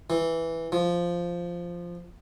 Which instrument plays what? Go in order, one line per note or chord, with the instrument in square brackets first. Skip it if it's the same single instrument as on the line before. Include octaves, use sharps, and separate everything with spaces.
[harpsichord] E3
F3